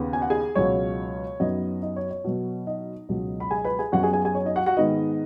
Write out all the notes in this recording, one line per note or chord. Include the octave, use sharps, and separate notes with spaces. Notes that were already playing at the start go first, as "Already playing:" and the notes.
Already playing: D#2 C#3 B3
G#5
F#5
G#4 G#5
C#2 B2 F#3 C#5
F#2 F#3 B3 D#4 D#5
D#4 D#5
C#5
C#5
B2 F#3 B3
D#4 D#5
C#2 B2 F#3
B5
G#4 G#5
B4 B5
G#4 G#5
F#2 F#3 B3 F#4 F#5
G#4 G#5
G#4 G#5
G#4 G#5
C#5
D#4 D#5
F#4 F#5
F#4 F#5
G#2 D#3 G#3 B3 D#4 D#5